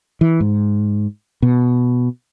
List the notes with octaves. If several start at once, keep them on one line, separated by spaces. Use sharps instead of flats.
E3
G#2
B2